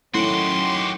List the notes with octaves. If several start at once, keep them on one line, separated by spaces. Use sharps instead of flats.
D#3 F#3 A3 C#4 E4 F#4 G4 C6